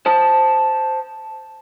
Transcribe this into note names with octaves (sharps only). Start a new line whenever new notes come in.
C5 A5